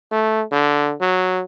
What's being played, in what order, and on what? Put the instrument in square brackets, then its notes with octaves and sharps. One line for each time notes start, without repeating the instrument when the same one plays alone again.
[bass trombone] A3
D3
F#3